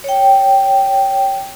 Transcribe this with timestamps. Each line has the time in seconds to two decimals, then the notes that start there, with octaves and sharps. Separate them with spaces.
0.04 C#5 G5